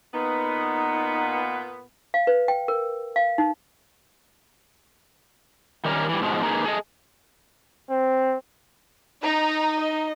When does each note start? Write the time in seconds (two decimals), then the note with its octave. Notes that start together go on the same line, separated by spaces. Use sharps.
0.14 A#2 B3 D#4
2.14 F5
2.27 B4
2.48 G5
2.68 A#4
3.16 F5
3.38 D#4
5.85 D#3 G3 C#4 A#4
6.09 E3 G3
6.22 G#2 B2 F3 G#3
6.43 A#3 D#4 F#4 G#4 B4
6.64 G#4 A4 D#5
7.90 C4
9.23 D#4 A#5
9.78 D#5